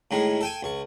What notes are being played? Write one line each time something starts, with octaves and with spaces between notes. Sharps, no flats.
A2 D#3 G#3
A4 G5 G#5
C#2 C#6